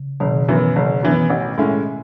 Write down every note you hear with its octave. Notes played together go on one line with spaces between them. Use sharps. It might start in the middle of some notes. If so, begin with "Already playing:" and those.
Already playing: C#3
F#1 B2 D#3
F#2 E3 B3
F#1
F#2 E3 B3
A1
A2 G#3 C#4 E4